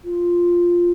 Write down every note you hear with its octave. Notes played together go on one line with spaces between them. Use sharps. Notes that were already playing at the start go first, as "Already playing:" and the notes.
F4